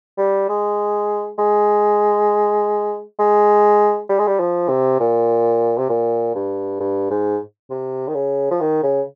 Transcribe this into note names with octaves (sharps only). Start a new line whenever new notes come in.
G3
G#3
G#3
G#3
G3
G#3
G3
F3
C3
A#2
C3
A#2
G2
G2
G#2
C3
D#3
C#3
F3
D#3
C#3